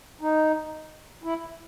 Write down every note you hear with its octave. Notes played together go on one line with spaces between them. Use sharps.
D#4
E4